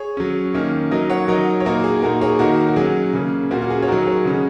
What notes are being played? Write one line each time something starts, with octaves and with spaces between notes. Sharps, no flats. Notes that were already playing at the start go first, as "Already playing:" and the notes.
Already playing: G#4 C#5
F#3 C#4
D#3 A#3 C#4
F#3 D#4 A#4 D#5
C#5 F#5
F#3 D#4 A#4 D#5
C#5
A#2 A#3 D#4 F#4 A#4
G#4
A#2 A#3 D#4 F#4 A#4
G#4 C#5
D#3 A#3 D#4 F#4 A#4
F#4
F#3 G#4
C#4
C#3 A#3 C#4
A#2 A#3 C#4 F#4
F#4
G#4
C#5
F#3 D#4 F#4 A#4
G#4 C#5
C#3 G#3 C#4